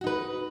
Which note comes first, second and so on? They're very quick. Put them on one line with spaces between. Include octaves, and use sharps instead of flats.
F#4 D#4 B4